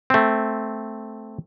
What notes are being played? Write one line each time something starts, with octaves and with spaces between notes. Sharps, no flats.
A3 C4